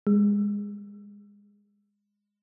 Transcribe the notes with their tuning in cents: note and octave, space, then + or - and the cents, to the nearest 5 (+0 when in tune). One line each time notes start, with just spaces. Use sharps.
G#3 -25